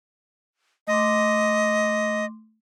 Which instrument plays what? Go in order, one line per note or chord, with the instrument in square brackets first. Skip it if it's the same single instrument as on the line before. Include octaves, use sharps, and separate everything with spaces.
[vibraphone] A3 C6 D6 [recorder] D#5